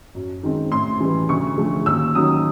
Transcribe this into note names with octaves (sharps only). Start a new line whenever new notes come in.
F#2
D#3 G#3 C4
A2 C6
E3 G3
D2 C#6
D3 F3 A3
D#2 E6
D#3 F#3 D#6